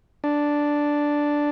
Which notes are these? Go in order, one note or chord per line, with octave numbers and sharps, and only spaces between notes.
D4